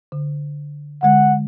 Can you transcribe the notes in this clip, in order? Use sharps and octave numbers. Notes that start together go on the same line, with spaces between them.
D3
D3 G#3 F#5